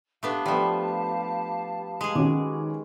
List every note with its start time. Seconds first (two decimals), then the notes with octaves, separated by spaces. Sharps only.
0.23 A3 B3 D4 G4 F5 A5
0.46 F3 G3 A3 B3
2.01 G#3 G#4
2.15 D#3 C#4 F#4 D6